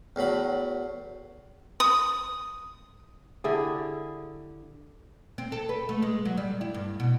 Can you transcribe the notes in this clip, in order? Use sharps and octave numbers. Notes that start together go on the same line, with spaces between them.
E2 A2 F#3 B5
D#6
D3 E4 G4 G#4
C4
A4
B4
A3
G#3
F#3
G3
E4
G2
B2